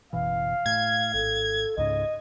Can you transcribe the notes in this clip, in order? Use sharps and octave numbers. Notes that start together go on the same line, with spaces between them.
F#1 B2 E3 F5
A2 G#6
G#1 A4
C#2 G#2 C#3 D#5